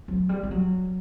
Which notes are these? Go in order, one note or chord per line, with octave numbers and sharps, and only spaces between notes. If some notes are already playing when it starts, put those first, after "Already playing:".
F#3
G3
G3
F#3